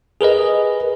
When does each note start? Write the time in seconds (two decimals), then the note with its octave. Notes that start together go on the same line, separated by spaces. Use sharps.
0.21 G#4 A#4 B4 D#5